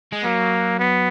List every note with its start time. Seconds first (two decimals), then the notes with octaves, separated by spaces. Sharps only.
0.13 G#3
0.24 F#3 A#3
0.79 B3